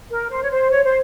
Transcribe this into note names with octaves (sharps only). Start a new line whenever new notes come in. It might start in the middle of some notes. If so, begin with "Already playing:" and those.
A#4
C5
C#5
C5
C#5
C5